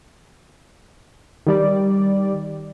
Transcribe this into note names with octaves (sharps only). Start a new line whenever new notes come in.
D#3 G3 D5